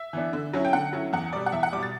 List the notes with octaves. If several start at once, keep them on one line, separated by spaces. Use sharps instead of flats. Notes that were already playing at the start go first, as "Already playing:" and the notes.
Already playing: E5
E3 B3 D4
D3
F#3 C#4 E4
G5
D3 F#5
F#3 C#4 E4
E2 F#5
B2 G3 D5
F#5
E2 E5
F#5
B2 G3 D6
A6